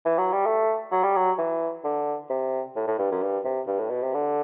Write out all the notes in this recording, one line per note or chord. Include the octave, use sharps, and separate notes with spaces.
E3
F#3
G3
A3
F#3
G3
F#3
E3
D3
C3
A2
A2
G2
F#2
G2
C3
G2
A2
B2
C3
D3